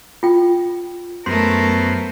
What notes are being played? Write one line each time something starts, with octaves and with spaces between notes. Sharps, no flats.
F4 G5
F#2 A3 B3 A#4 C5 C6